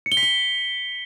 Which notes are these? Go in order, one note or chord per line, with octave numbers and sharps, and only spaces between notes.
C#7
G7
B6
G7